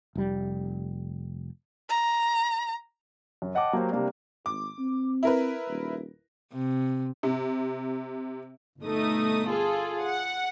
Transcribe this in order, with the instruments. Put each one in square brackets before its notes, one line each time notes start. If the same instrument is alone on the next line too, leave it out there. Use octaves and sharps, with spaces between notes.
[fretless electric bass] F1 G3
[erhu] A#5
[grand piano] F#2
D#5 F#5 G5 A5 D6
F#3 A#3 G4 C5
C3 G3 A#3 D4
[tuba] G#1 [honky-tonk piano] D6
[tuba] C4
[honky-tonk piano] E4 A#4 B4
[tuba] D#1
[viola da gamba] C3
[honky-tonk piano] C3
[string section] G1 B2 A3 D#4 D#6
F4 G#4 A4
F#5